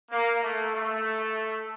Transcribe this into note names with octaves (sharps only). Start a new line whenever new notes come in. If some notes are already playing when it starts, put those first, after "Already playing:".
A#3
A3
A3